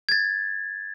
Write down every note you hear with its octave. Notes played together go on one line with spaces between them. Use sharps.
G#6 A6